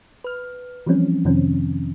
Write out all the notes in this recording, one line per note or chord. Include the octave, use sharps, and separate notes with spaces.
B4 F6
E3 F3 G3 C4 C#4
F2 C3 D#3 F3 C4 C#4